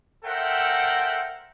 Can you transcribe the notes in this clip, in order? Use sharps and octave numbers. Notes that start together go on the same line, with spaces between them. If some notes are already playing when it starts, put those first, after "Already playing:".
A4 A#4 C5 E5 F#5 G5